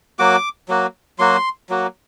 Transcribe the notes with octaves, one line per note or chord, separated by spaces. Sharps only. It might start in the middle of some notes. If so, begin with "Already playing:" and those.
F#3 A#3 F#4 D6
F#3 A#3 F#4
F#3 A#3 F#4 C6
F#3 A#3 F#4